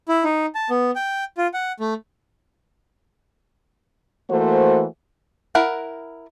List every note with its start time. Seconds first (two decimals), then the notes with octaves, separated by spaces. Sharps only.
0.09 E4
0.24 D#4
0.55 A5
0.70 B3
0.96 G5
1.38 F4
1.54 F#5
1.80 A3
4.30 E3 A3 A#3 F#4 C5
5.55 E4 A#4 F#5